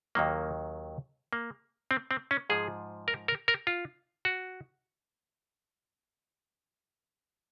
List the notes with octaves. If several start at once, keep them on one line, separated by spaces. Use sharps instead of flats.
D#2 D#3 F#3 A#3
A#3
C4
C4
C#4
G#2 F3 G#4
A#4
A#4
A#4
F4
F#4